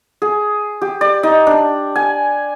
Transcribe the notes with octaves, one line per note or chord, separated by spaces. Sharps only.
G#4
G4
D5
D#4
D4
G#5